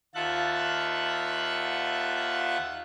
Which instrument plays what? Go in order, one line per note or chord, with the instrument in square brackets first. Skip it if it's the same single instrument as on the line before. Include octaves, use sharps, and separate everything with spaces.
[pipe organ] D#2 F4 E5 F#5 A5 F#6